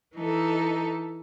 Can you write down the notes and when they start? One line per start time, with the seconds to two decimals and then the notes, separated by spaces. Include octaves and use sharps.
0.15 E3 D#4 A4